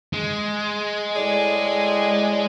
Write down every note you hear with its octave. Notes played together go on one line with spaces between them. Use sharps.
G#3
A2 G#4 D5